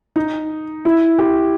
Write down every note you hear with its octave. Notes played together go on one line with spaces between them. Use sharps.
D#4
E4
G4